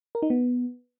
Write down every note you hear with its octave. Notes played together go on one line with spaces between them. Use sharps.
A#4
D#4
B3